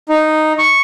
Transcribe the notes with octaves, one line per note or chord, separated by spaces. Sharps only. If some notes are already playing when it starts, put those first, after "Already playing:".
D#4
C#6